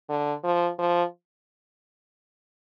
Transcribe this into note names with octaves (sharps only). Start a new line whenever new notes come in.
D3
F3
F3